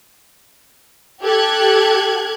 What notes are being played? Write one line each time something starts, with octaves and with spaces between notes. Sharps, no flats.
G4 A4 F#6 G#6